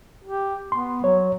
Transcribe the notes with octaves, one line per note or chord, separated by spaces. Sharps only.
G4
B3 C6
F#3 C#5